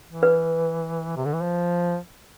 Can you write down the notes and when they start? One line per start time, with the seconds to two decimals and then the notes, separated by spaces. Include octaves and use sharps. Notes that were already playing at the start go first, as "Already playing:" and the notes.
0.08 E3
0.23 B4
1.17 C3
1.25 D3
1.33 E3
1.42 F3